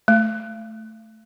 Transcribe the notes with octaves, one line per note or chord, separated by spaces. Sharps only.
A3